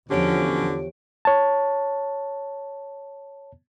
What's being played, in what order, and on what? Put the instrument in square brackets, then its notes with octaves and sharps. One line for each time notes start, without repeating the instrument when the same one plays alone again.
[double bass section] E2 F3 [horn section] B2 C#4 [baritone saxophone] D3 [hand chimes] G4 C#5 D7
[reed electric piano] C#5 A5